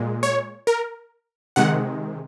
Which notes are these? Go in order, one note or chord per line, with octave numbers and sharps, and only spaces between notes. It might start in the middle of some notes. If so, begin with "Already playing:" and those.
Already playing: A#2 G#3
C#5
A#4
C3 D#3 G#3 F#5